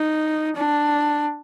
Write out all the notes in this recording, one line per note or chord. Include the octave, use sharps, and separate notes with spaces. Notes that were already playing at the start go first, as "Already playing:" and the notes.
Already playing: D#4
D4